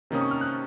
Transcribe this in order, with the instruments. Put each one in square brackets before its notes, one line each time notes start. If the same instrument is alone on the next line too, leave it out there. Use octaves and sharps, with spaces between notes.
[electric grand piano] C3 D#3 A#3 C#4 [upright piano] D#6
[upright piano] C#6
F6
F#6